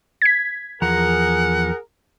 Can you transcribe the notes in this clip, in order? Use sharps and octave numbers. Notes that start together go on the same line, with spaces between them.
G#6 B6
E2 F3 G#4 A#4 F#5 A#5